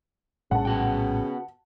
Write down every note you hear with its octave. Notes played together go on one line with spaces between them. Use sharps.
A#1 A2 C#3 G3 F#5 A5
B3 F#4 G5